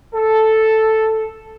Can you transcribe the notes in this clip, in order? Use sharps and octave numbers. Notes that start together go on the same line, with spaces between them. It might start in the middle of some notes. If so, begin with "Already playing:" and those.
A4